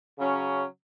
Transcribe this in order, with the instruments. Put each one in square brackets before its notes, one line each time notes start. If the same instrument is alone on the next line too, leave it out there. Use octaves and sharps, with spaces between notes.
[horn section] C#3 F#3 C#4